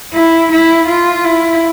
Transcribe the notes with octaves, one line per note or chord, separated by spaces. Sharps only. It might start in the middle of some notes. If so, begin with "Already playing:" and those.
E4
E4
F4
E4